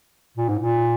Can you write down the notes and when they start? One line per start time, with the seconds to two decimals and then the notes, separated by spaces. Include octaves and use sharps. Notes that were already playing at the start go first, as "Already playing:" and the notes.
0.37 A#2
0.49 G#2
0.59 A#2